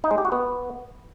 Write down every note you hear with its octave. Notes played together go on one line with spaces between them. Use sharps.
D#4
G#3
G4
F#4
B3